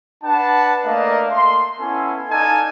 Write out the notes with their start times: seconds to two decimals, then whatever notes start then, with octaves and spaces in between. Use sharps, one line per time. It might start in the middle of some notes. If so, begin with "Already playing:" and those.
0.24 D4 B4 F#5 A5
0.86 A3 A#3 A#4 D5 D#5 F5
1.32 C6
1.79 B3 C#4 E4 A4 G#5
2.31 D#4 A4 D5 F5 G#5 A5